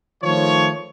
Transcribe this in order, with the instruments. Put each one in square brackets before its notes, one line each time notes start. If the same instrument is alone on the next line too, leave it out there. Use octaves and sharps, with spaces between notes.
[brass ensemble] D#3 F3 A3 C#5